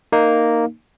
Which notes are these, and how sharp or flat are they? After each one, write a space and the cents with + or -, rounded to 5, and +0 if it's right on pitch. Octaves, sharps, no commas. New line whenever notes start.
A#3 -5 D#4 -5